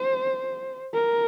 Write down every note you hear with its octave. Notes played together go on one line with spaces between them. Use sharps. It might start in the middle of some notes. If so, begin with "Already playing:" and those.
Already playing: C5
A#4